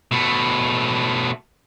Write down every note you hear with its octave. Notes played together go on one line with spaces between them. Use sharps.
B2 A3